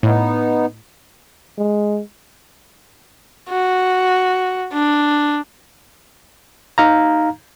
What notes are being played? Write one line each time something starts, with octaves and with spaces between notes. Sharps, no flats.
A2 B3 D#4
G#3
F#4
D4
D#4 F5 A#5